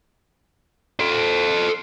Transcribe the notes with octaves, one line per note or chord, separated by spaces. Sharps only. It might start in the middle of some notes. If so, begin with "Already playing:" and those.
A4 C5